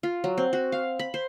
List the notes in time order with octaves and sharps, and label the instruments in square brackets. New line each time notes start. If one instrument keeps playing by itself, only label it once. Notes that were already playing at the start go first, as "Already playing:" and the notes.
[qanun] F4
F#3
C4
F#4
F5
B5
C5